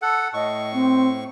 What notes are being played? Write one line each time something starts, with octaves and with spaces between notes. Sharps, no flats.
A4 F#5
A2 D#5 C#6
C4